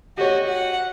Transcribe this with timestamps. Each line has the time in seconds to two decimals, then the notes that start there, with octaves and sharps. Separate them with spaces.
0.18 F#4 G4 C#5 D#5
0.46 F#5